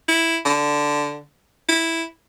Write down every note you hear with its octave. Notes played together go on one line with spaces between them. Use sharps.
E4
D3
E4